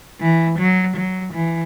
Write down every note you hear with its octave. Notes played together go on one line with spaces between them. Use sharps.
E3
F#3
F#3
E3